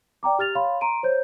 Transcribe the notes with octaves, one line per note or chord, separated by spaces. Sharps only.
D5 G5 A#5 D6
G4 F6 A6 F7
C#5 F5 B5 C6
A#5 C6 D7 D#7
C5 C#5 G6